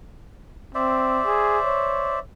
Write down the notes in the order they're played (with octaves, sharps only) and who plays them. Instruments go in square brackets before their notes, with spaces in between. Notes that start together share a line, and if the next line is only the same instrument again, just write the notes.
[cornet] C4 [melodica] C5 D5 E5
[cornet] G#4
C#5